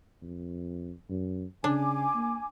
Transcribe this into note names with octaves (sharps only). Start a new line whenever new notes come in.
F2
F#2
C#3 D4 G#5 D6
A#3